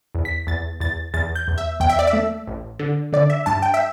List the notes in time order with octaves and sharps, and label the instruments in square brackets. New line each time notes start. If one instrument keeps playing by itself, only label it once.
[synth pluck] E2
B6
E2 A6
E2 A6
E2 A6
G6
E2
E5
E2 G5
E5
D5
E5
A3
A1
D3
D3 D5
E5
G2 A5
G5
E5